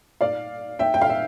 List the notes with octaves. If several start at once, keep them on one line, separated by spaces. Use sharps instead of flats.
D5 F5
E5 G5
G5
F5
E5